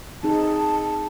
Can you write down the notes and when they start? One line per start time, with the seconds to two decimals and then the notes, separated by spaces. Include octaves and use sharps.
0.23 C4 D#4 G#4 A5